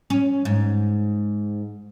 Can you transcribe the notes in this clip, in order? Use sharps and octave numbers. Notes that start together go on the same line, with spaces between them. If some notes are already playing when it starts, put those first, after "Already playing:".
C#4
G#2